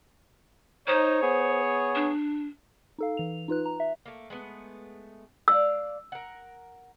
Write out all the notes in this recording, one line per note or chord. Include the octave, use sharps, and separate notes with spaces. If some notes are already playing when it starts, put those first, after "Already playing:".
D#4 C5 C#5
B3 G#4 C#5
D4
D#4 A4 F5
E3 F7
D#4 F4 B4 F#6
A#5
E5
A3 A#3
G#3 A3 B3
D4 D5 F5 E6
A#4 F#5